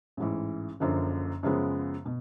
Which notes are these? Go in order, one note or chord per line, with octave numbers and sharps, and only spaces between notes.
A1 G#2 E3
F#1 F#2 D3 F3
F#2 C#3 F3 G#3 B3
B2